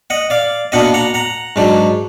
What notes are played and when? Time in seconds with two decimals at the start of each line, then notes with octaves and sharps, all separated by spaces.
0.10 D#5 F#5
0.30 D5 F5
0.72 B2 A#3 D4 D#5 F#5
0.94 F#5 A#5
1.14 F#5 A#5
1.56 G#2 F#3 D4